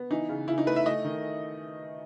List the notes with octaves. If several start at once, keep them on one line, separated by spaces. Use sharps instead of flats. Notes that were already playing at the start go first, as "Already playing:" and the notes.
Already playing: B3
E3 D#4
C#3
C#3 E4
D#4
A3 B4
E5
A3 D#5
D#3